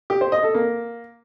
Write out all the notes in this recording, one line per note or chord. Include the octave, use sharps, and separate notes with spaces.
G4
C5
D#5
A4
A#3